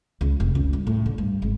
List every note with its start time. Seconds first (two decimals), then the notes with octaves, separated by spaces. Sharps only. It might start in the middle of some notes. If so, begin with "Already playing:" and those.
0.21 C#2
0.40 F1
0.55 C#2
0.73 G2
0.87 A2
1.06 D3
1.18 G2
1.42 G#1